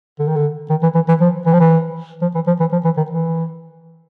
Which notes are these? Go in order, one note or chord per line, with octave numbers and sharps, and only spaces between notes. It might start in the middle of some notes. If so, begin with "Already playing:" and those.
D3
D#3
D3
D#3
E3
E3
E3
F3
E3
F3
E3
F3
E3
F3
E3
F3
E3
D#3
E3